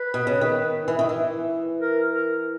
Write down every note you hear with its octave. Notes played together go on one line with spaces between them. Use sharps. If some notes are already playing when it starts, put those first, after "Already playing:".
Already playing: B4
B2
C#3
D#3
E3
D#3
E3
A#4
A#4